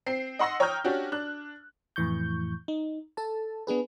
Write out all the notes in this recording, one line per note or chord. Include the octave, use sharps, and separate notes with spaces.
C4 C7
D#5 F#5 C6 E6 A#6
C#5 G5 A#5 D#6 F6 G6
C#4 D4 F#4 G4
D4 F#6
F2 A2 E3 C#6 G6
D#4
A4 A5
B3 D4 G#4 B4